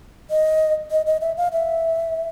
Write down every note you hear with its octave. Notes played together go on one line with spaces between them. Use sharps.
D#5
D#5
D#5
E5
F5
E5